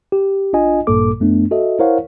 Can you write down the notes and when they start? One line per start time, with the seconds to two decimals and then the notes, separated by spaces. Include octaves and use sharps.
0.12 G4
0.53 A1 D4 F4 D#5 G#5
0.87 A1 G2 A#2 A#3 A4 D6
1.20 F#2 A3 B3 D4
1.51 F#4 A4 D#5 E5
1.79 E4 A#4 C5 C#5 F5 F#5